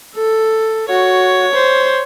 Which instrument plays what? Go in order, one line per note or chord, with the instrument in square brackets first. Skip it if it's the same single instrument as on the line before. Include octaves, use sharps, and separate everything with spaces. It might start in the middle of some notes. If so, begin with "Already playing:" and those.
[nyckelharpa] A4
[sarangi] F#4 [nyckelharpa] C#5
[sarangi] C5